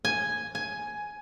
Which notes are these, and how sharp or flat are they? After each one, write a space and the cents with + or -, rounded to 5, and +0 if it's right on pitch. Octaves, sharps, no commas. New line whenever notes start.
G#5 +0
G#5 +10